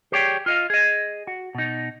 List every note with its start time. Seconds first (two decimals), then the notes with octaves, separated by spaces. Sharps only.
0.12 G4 G#4 C#5 D5 G5
0.46 F4 D#5 F5
0.70 G#4 D#5
1.27 F#4
1.55 B2 D#4